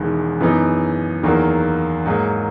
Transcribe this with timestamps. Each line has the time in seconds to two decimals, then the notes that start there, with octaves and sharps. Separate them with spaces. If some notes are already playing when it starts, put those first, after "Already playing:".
Already playing: E1 E2 D#3 G#3
0.40 F#2 E3 B3 D#4
1.23 E2 D#3 F#3 A#3
2.06 G#2 F#3 A#3